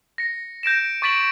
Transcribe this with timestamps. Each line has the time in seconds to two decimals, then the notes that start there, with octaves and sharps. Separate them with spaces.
0.18 A#6 C#7
0.63 G6 A#6 D7 E7
1.02 C#6 D6 A6 B6 D7 F#7